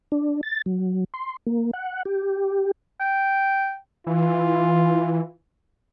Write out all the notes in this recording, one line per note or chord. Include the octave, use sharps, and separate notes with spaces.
D4
A6
F#3
C6
A#3
F#5
G4
G5
E3 F4